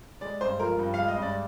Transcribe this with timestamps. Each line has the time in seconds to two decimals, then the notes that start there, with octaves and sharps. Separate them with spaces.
0.21 G#3 D5
0.41 G2 C5
0.60 F3 A#4
0.79 G2
0.94 G#3 F5
1.08 D#5
1.17 G2 D5